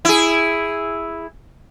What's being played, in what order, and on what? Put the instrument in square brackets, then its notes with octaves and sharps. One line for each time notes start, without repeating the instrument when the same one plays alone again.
[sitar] E4 G#4